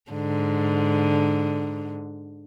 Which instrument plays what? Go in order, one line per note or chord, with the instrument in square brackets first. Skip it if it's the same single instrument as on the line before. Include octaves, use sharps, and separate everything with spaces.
[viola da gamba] G#2 D3